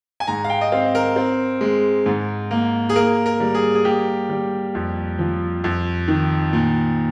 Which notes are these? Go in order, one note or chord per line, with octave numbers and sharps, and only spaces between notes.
G#5
G#2 A#5
F5
G5
D#5
C4 F5
A#4
C4
G#3
G#2
A#3
G#4
A#3 A#4
A#4
G3
G#4
G#4
A#3 G4
G3
F2
F3
F2
D#3
A#2